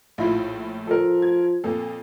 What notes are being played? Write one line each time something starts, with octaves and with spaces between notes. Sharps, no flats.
A#1 A2 E4 F4
F3 A4 A#4
G#6
F2 A#2 A#3 A4